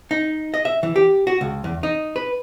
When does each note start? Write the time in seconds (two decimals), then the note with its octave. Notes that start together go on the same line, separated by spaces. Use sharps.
0.11 D#4
0.54 D#5
0.65 E5
0.83 E3
0.96 G4
1.27 F#4
1.41 C#2
1.64 E2
1.83 D#4
2.16 B4